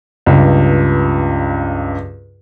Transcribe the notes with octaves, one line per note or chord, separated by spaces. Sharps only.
C#2 G2